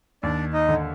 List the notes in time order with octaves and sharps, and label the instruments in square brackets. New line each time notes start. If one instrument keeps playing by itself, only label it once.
[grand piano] D#2 [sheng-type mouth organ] D4 D5
[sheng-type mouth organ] D#4 D#5
[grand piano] D3